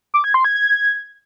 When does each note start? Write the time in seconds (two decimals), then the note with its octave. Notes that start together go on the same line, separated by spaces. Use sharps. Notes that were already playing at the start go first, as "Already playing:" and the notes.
0.14 D6
0.24 G#6
0.34 C6
0.45 G#6
0.55 G#6